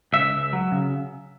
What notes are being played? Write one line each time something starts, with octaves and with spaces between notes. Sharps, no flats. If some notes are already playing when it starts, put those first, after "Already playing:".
C#2 E5
C#2
F#3
C#3